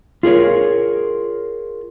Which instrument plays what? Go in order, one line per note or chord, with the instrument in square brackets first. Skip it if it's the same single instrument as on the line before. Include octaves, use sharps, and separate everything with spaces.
[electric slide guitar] F4 G#4 A#4 C#5